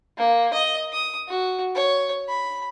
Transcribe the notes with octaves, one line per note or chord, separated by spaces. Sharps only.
A#3
D#5
D#6
F#4
C#5
B5